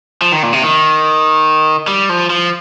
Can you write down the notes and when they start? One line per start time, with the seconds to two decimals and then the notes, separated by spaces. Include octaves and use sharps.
0.22 F3
0.32 D#3
0.43 A#2
0.53 C3
0.63 D#3
1.88 G3
2.09 F3
2.30 F3